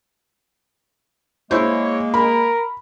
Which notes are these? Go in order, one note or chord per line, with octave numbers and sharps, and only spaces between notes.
G#3 A#3 E4 C5 C#5
A#4 B5